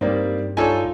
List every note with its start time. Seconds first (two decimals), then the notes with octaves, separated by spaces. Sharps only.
0.01 G2 G3 A#3 C4 D#4 D5
0.57 D#4 F4 A4 C#5 D5 G#5